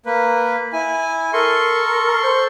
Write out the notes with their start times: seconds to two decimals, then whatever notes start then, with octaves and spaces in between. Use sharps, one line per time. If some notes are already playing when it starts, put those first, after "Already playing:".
0.06 A#3 B4
0.73 E4 G#5
1.33 A4 A#4 C6 C#6
2.23 C5